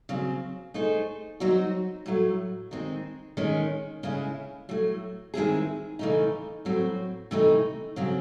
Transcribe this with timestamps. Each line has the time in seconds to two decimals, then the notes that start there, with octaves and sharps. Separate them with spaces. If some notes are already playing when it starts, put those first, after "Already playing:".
0.09 C#3 F#3 C4
0.74 A3 D#4 G#4 C5
1.40 F#3 C4 D#4 F#4
2.06 A2 F#3 A3
2.71 D#3 G#3 C4
3.37 D#3 G#3 C#4
4.03 C#3 G#3 C#4 E4
4.69 A2 F#3 A3
5.34 D#3 G#3 C4 E4 G#4
5.99 C#3 E3 A3 D#4
6.65 A2 F#3 C4 F#4
7.31 C3 E3 A3 D#4
7.96 C#3 F#3 C4 F#4